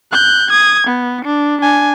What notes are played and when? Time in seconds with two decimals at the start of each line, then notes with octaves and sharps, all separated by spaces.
0.12 F#6 G6
0.51 D#6 G#6
0.87 B3
1.25 D4
1.61 D4 G#5